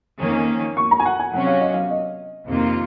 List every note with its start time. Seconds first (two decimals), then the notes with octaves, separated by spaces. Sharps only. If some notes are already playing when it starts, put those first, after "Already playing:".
0.20 F2 D#3 A#3 C#4
0.77 C#6
0.91 A#5
1.00 G#5
1.05 F#5
1.19 G#5
1.33 C3 F#3 C#4 F#4 F#5
1.47 F5
1.61 D#5
1.74 F5
1.91 D#5
2.47 F2 C3 D#3 A#3 F4